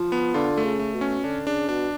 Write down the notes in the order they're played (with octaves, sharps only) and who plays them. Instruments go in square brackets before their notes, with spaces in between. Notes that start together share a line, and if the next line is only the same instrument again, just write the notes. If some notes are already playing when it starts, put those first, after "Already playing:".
Already playing: [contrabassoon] F3
[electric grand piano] B3
[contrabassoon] D3 [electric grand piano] F4
[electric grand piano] A3
[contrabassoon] C#3
[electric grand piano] A3
[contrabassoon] B2
[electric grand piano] C#4
[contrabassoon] D3 [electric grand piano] D4
[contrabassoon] C#3 [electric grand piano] D4
[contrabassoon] B2 [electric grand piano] D4